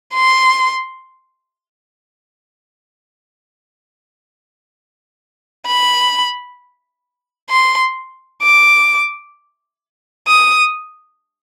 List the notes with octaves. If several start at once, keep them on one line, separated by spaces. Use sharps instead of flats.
C6
B5
C6
D6
D#6